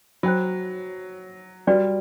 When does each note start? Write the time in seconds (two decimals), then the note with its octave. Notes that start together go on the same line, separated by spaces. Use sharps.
0.23 F#3 C5 G5 B5
1.67 G3 F#4 B4 D5 G5